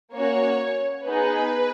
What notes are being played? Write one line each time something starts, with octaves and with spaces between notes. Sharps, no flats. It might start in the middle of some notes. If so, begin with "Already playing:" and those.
A#3 C#4 F#4 C#5
B3 D#4 G#4 B4